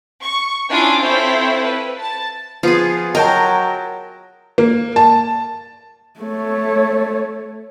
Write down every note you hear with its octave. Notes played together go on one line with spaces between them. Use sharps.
C#6
C#4 D4 E4 F4 G#5 D6
C4 E4 F4 A4 C5 C#5
B4
A5
F3 B3 F4 G#4
F#3 A#4 D#5 G5 A5
A#3
A5
A3 C#5